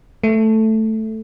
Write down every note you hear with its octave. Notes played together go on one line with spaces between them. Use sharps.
A3